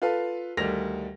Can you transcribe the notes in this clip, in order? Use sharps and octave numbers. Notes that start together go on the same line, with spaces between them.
F4 A4 B4 F5
D2 D#3 G3 A#6 F7